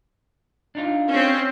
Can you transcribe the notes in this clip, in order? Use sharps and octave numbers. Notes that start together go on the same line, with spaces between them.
D4 D#4 F4
C4 C#4